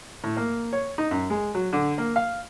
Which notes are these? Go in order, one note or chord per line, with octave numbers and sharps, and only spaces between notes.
A2
A#3
C#5
D#4
F#2
G#3
F#3
D3
A#3
F5